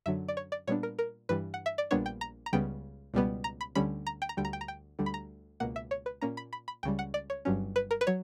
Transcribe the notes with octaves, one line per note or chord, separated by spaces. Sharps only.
F#2 D3 F#3 E5
D5
C#5
D5
A#2 G3 B3 D4 C#5
A#4
A#4
G2 E3 G3 B4
F#5
E5
D5
A#1 A#2 G3 B3 D4 C#5
G5
A#5
A#5
C#2 C#3 G3 B3 G5
C#2 B2 G3 B3
A#5
B5
D2 D3 G3 C#4 B5
A#5
G5
A#5
D2 D3 G3 G5
A#5
G5
A#5
G5
D2 D3 G3
B5
A#5
C#2 B2 A#3 F#5
E5
C#5
B4
A#2 A#3 C#4 A#5
B5
B5
B5
C#2 C#3 G3 G5
F#5
D5
C#5
G1 G2 F#3 C#4
B4
A#4
B4
F#3 C#5